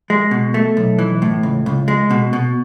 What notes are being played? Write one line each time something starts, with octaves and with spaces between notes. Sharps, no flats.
G#3
B2
A3
B1
E3
A2
C#2
C#2
G#3
B2
B2